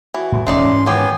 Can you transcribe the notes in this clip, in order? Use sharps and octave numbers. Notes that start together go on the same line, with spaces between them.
E3 F#4
A2 F#3 G3
E1 D2 A3 C#4 D#4 D5 C6
G#2 E3
D#3 F#3 B3 C4 G4 G#5